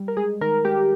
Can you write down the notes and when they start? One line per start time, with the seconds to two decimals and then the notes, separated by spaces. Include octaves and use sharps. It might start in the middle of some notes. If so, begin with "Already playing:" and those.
Already playing: G3
0.08 A#4
0.17 G#3 G#4
0.41 D#3 A#4
0.65 G#3 G4